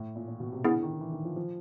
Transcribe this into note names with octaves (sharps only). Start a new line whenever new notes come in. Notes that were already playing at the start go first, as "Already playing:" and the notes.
Already playing: A2
A#2
A#2
B2
C3
D3 B3 E4 G#4
D#3
E3
D#3
F3
F3